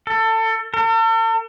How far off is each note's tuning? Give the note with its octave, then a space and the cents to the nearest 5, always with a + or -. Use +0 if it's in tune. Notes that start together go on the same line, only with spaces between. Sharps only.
A4 +25
A4 +45